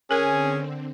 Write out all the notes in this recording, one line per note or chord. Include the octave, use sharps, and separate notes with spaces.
D3 C4 C#4 G#4 A#4